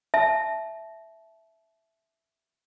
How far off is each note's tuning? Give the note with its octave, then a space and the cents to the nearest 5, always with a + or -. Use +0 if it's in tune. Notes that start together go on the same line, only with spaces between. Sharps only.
E5 +0 A5 -25